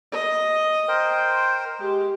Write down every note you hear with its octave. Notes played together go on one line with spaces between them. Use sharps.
D#5
A#4 C5 G5
G#3 G4